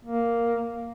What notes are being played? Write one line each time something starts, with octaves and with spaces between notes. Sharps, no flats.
A#3